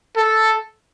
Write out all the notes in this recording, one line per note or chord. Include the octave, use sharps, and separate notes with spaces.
A4